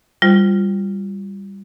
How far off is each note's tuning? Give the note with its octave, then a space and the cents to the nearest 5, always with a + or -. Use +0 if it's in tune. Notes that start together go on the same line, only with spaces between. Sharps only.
G3 +5 F4 +0 C5 +0